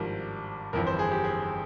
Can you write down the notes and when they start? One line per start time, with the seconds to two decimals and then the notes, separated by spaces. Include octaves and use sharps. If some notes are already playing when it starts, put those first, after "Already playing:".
Already playing: G#1 G2 F3 A#4
0.73 G1 F2 E3 A#4
0.87 C5
0.99 G#4
1.11 G4
1.24 G#4